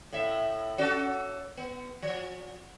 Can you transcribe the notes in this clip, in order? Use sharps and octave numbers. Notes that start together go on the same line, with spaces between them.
A2 E5
C#4 F#4 A4
B3
F3